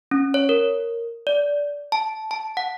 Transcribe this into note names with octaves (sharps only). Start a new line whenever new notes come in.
C#4
C#5
A#4
D5
A5
A5
F#5